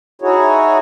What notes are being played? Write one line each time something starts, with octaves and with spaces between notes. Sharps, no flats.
D#4 E4 F#4 G#4 C#5